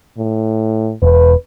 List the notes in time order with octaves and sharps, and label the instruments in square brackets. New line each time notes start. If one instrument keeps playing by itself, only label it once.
[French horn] A2
[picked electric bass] E1 [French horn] B4